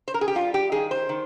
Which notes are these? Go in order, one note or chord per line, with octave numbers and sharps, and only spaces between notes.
C5
A#4
G#4
G4
G3 F4
G4
D#3 G#4
C5
D#3